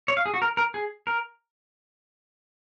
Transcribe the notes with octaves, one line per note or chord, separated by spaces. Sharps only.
C#5
F5
G#4
F#4
A#4
A#4
G#4
A#4